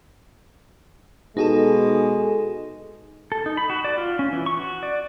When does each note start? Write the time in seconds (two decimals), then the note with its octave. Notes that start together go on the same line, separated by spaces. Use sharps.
1.37 B2 G#3 D#4 G#4 A4
3.32 A4
3.46 D#4
3.57 B5
3.70 F#4
3.84 D5
3.98 F4
4.19 C#4
4.32 E3
4.46 C#6
4.59 F#4
4.83 D5